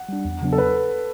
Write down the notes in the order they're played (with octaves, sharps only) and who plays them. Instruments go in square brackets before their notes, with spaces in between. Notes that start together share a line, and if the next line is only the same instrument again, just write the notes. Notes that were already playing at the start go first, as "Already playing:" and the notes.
Already playing: [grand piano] F#5
[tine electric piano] G3 D4
E2
C#3 F#3 B3 D4
[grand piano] A4
B4